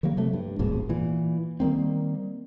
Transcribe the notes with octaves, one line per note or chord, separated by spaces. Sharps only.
D#3 F#3 G3 A#3
C3 F#3 A3
G2
D1 A#1 G#2 B2
A#2 E3
D#3 G3 A#3 C4